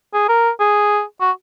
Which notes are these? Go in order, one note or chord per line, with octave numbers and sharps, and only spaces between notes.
G#4
A#4
G#4
F#4